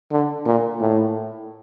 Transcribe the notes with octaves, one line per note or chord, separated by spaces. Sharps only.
D3
A#2
A2